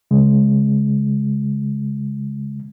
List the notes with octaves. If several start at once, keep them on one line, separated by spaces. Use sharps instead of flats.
C#3 G#3